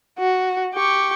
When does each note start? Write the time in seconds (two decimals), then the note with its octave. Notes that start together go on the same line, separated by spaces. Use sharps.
0.19 F#4
0.74 G4 C#6